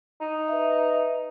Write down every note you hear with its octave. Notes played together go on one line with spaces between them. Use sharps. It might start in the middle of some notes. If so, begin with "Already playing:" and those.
D#4
B4 E5